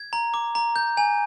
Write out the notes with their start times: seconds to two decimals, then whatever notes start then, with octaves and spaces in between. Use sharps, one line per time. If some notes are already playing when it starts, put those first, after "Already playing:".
Already playing: G#6
0.13 A#5
0.34 D6
0.55 A#5
0.76 G6
0.97 G#5